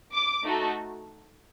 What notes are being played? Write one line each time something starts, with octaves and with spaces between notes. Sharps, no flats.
D6
A3 D#4 F#4 A4